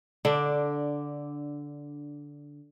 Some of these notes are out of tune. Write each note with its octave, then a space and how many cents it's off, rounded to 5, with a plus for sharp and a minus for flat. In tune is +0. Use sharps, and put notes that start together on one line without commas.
D3 -10 D4 +0